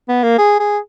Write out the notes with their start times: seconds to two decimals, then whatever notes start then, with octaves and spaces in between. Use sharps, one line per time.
0.09 B3
0.24 A#3
0.39 G#4
0.60 G#4